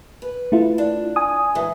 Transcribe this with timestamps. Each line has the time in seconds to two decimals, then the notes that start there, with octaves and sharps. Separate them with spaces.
0.22 B4
0.52 A3 E4 F4
0.78 D4
1.16 G#5 D#6
1.55 G#2 E3